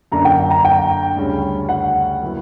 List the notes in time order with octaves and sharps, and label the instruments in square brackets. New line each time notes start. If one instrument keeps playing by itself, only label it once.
[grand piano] F#2 D3 A#3 D4 [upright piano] A#5
[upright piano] G5
A#5
G5
[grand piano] D2 C#3 G3 C#4
[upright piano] F#5
[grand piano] F#3 A#3 E4 B4